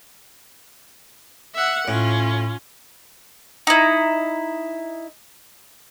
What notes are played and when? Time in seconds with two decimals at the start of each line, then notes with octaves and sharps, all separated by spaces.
1.54 E5 F#5
1.88 A2 C#4 F4
3.67 D#4 E4